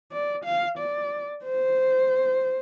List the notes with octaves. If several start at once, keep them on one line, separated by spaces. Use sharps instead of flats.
D5
F5
D5
C5